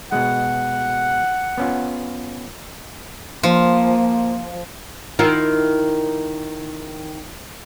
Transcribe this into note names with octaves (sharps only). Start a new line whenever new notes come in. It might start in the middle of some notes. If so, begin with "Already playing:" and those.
B2 G#3 F#5
B3 C#4 F4
F3 A#3
D#3 E4 F4